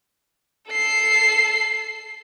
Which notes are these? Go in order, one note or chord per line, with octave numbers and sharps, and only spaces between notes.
A4 C7